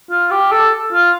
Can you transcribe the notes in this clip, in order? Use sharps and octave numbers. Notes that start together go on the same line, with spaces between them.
F4
G4
A4
F4